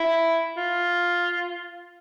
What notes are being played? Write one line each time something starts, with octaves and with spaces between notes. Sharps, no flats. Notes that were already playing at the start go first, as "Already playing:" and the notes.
Already playing: E4
F4